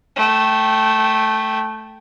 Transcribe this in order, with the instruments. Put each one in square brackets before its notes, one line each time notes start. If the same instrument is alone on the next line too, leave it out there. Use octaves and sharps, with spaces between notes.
[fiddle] A3 G5